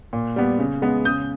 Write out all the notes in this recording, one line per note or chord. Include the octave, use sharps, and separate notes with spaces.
A#2
G3 B3
C#3
G#3 B3
C#3 D#6 G6